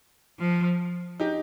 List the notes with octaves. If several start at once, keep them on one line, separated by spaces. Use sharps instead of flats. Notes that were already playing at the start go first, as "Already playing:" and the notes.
F3
D#4 G4